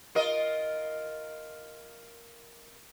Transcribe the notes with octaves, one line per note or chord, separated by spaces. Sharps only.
F4 A#4 D#5